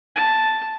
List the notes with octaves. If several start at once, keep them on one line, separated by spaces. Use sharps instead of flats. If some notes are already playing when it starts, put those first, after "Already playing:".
A5